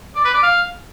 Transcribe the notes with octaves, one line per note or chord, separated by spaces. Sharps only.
D5
B4
D5
F5